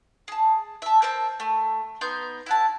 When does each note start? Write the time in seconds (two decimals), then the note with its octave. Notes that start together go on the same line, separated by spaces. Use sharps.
0.28 G#4 A5
0.82 E5 A5
1.02 A#4 C5 E5 A5
1.40 A3
2.01 B3 D#4 C6 G6
2.46 E4 F#4 A5